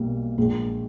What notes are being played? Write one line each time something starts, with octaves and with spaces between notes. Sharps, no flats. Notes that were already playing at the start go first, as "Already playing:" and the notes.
Already playing: B1 B2 G3 A#3
A#1 A#2 G#3